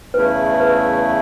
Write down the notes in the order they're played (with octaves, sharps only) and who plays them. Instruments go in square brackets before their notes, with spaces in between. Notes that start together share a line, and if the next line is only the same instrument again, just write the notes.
[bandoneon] E2 C#3 A3 E4 [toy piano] B4
[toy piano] B4